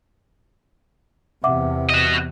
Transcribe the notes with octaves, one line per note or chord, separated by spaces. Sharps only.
E2 C3 E5 F#5 D6
F#4 D#5